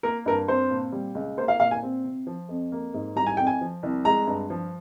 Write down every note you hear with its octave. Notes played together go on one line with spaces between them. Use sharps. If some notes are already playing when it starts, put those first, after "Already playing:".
A#3 A#4
G2 A#4
C4 C5
A#2
G3
C#2
A#3 C5
F5
A#2 F5
G#5
C4
C3
F3
F2
A#3
G#2
G3 A#5
G#5
F2 G5
G#5
F3
C2
G#3 A#5
G2
F3